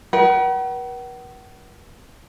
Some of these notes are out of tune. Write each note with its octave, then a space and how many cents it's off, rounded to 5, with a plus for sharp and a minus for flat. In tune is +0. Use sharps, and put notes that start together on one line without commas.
B4 -45 F#5 +40